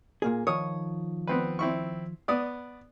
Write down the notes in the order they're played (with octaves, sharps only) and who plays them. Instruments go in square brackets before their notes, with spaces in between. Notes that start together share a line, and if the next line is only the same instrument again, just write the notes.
[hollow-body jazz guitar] A#2 A#3 G#4
[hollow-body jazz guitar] D#3 F3 C#5 [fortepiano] D#6
[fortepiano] B3 C4 B4
C4 E4 C#6
B3 D5 D#6